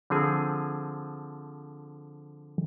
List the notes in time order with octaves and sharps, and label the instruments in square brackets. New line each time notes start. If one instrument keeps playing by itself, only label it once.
[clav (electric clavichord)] D3 F3 C4 G#4 G#5